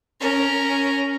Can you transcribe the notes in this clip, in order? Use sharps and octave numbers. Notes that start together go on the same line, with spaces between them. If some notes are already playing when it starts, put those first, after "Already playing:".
C#4 A#4